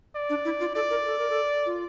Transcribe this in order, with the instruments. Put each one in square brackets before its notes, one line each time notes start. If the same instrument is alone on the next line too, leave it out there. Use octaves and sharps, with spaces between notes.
[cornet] D5
[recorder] D4
E4
F4
[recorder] A4 [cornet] D5
[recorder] A#4
A4
A#4
A4
F4